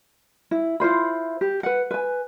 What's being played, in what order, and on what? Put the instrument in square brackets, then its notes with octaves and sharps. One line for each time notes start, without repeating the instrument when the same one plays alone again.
[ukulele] E4
E4 F4 C5 B5
G4
B4 F#5
B4 G#5